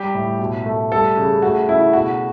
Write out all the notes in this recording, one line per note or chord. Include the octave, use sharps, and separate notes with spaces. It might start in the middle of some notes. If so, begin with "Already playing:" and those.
Already playing: G3 G4
A2
B2
A3
G3 A4
C#3
A3 F#4
C#3 E4
B2 F#4